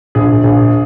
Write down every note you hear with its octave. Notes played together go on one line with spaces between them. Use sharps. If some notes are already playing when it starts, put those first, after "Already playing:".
A#1 G#4
A#1